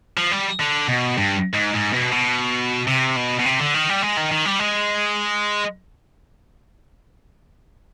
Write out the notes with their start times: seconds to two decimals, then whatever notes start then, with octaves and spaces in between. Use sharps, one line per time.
0.17 F3
0.32 G3
0.59 D3
0.88 B2
1.18 G2
1.55 G#2
1.75 G#2
1.93 B2
2.13 B2
2.88 C3
3.17 B2
3.39 B2
3.46 C3
3.60 D3
3.74 D#3
3.89 G3
4.02 G#3
4.17 D#3
4.32 D#3
4.46 G3
4.59 G#3